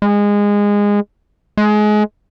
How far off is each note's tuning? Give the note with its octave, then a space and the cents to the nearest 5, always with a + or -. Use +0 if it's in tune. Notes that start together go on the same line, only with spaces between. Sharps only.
G#3 -20
G#3 +25